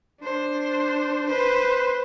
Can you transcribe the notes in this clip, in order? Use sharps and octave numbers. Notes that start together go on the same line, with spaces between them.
D4 C5
B4 C5